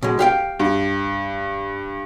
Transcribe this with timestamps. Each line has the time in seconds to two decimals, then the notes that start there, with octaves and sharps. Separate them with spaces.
0.03 B2 G#3
0.19 G4 F5 G5
0.59 G2